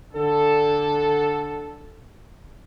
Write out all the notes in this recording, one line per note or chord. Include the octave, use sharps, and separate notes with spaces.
D3 A4